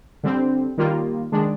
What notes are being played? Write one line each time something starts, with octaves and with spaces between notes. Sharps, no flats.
D3 G3 C4
D#3 G3 A#3 F4
D#3 G#3 D4